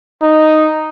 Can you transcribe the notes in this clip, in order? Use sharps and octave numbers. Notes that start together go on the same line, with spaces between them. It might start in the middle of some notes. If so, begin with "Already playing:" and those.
D#4